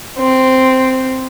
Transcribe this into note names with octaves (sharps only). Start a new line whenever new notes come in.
C4